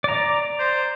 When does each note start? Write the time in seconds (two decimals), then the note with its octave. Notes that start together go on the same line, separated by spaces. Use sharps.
0.04 D5 A#5
0.59 C5